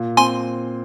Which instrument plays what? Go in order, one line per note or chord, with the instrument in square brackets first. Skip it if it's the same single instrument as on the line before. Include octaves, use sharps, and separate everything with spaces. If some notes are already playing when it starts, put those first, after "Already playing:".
Already playing: [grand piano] A#2
[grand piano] C4 [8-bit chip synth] G#5 C6